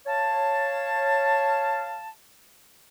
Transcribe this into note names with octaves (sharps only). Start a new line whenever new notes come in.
C#5 F5 A5